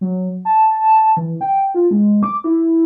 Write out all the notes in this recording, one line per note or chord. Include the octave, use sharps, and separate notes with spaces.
F#3
A5
E3
G5
F4
G#3
D6
E4